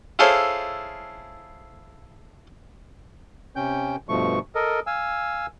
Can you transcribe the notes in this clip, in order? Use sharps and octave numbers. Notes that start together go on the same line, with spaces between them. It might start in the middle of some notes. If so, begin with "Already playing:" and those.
E4 F4 G#4 A4 C5 C#5
C3 C#4 G5 G6
G2 B2 F3 A3 C#6
A4 A#4 D#5
F5 G#5 E6